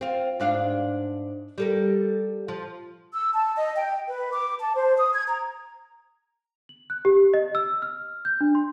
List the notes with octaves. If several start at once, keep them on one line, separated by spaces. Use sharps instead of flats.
C4 F4
G#2 D4 F5
G3 A4 A#4
F3
E6
A5
D#5
G5
B4
D6
A5
C5
D#6
G#6
A#5
F#7
F#6
G4
D#5
E6
F6
G6
D4
C6